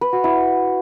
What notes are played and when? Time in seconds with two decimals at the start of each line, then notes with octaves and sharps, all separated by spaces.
0.01 B4
0.13 F#4
0.24 E4